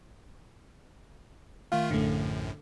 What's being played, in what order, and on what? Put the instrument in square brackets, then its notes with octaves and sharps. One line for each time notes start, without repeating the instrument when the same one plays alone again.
[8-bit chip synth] D#3 A3 F4 [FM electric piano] F5
[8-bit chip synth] A#1 F#2 A2 [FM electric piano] D3 A3